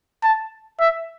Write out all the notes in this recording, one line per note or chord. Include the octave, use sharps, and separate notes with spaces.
A5
E5